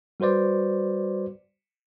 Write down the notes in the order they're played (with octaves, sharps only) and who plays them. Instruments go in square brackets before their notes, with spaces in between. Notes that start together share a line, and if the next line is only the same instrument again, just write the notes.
[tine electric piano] G3 F#4 B4 C5 D5